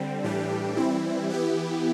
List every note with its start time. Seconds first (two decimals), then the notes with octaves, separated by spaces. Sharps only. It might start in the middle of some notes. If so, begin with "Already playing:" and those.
Already playing: D3 G3 C4
0.24 A2 E3 G3 D4 G4
0.77 E3 G3 C4 E4
1.29 E3 B3 E4 G4